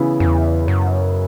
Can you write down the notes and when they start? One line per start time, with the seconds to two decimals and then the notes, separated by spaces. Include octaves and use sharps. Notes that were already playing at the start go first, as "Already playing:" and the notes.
Already playing: C#3 E3 B3 E4
0.20 F#2
0.26 E2
0.68 F#2